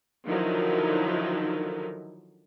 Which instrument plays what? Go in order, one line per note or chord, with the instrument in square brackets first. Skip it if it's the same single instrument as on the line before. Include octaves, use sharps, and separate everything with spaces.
[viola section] D3 D#3 F3 F#3 D#4 E4